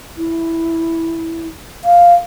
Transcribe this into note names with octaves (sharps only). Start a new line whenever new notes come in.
E4
F5